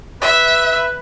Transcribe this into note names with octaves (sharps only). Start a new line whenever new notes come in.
B4 E5